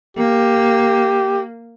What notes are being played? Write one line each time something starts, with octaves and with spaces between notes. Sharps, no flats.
A#3 G4